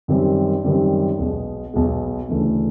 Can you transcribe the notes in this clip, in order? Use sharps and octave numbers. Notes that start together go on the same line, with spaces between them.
F#2 D#3 G3 C4
F#2 D#3 G3 C4
B1 B2 G#3
B1 B2 G#3
D2 C#3 E3 A3 D4